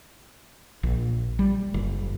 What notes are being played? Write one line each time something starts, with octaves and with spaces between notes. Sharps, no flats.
A#1
G3
F#1